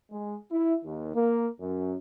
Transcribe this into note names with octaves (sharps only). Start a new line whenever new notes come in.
G#3
E4
D#2
A#3
F#2